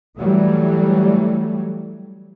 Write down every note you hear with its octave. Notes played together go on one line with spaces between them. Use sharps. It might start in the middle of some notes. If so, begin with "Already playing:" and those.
E3 F#3 G3 A3